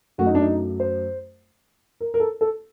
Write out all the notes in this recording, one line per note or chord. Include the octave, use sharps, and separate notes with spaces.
F#2 F#3 A3 F#4
D#4
D4
D#4
C5
A#4
A#4
A4
A4